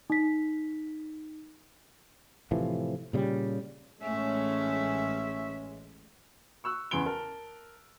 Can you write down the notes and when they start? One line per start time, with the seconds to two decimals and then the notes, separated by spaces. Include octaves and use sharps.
0.10 D#4 B6
2.51 A2 C3 E3 F3
3.13 A#2 C#3 G3
4.02 A1 G#3 A3 C#4 E5
6.64 C#6 E6 F#6
6.91 E2 C#3 C6 D7 G7
7.06 A#4 A5